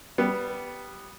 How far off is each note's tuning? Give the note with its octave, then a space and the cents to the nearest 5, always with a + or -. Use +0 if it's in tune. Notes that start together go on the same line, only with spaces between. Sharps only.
G3 -5 B3 +0